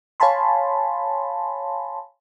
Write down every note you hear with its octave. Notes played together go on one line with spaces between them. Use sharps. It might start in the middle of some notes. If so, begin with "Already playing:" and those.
C#5 F5 G#5 A5 B5 C6